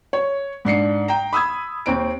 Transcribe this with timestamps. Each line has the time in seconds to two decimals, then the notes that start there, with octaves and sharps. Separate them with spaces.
0.13 C#5
0.65 G#2 D4 C7 C#7
1.08 G5 A#5
1.33 B5 D#6 E6 G#6
1.86 D#2 C4 D7